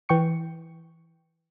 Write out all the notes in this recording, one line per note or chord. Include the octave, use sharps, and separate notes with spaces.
E3 G5 C#6 C#7